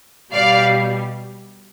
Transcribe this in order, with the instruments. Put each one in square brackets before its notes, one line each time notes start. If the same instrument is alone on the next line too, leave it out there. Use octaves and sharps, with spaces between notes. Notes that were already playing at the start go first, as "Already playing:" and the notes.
[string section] B2 G3 D5 F5